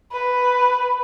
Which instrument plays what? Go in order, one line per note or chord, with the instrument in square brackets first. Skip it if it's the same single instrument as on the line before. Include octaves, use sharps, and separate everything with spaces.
[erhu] B4